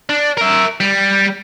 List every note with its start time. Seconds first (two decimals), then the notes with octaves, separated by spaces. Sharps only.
0.09 D4
0.38 A#4 E5
0.80 G3